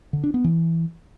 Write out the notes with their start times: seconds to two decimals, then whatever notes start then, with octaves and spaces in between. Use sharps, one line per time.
0.13 D3
0.23 D4
0.34 B3
0.44 E3